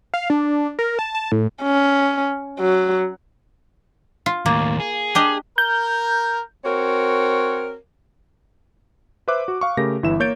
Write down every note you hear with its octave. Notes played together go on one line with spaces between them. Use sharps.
F5
D4
A#4
A5
A5
A2
C#4
F#3
F4
D#2 A2 A#3
G#4
D4 G4 D#5
A#4 G6
C4 F#4 A#4 C#5
B4 C5 E5 D6 F#6
F#4
F5 C#6
C#3 A3 G4 A#4 A#6
G1 E3 E4 E5 E7
A#3 C#5 G6 A6 D7